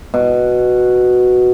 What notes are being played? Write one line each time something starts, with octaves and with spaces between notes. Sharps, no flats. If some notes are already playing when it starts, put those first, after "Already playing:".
B2